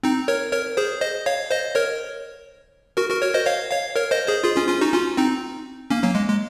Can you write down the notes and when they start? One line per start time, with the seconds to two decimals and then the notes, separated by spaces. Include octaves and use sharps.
0.03 C4 D#4
0.28 A#4 C#5
0.53 A#4 C#5
0.77 G#4 C5
1.01 C5 D#5
1.26 C#5 F5
1.51 C5 D#5
1.75 A#4 C#5
2.97 F#4 A#4
3.10 F#4 A#4
3.21 A#4 C#5
3.34 C5 D#5
3.46 C#5 F5
3.71 C#5 F5
3.95 A#4 C#5
4.11 C5 D#5
4.28 G#4 C5
4.44 F4 G#4
4.57 C#4 F4
4.68 C#4 F4
4.81 D#4 F#4
4.93 C#4 F4
5.17 C4 D#4
5.91 A#3 C#4
6.03 F#3 A#3
6.15 G#3
6.28 G#3